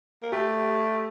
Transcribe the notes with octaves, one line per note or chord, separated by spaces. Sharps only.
A#3
A3 G4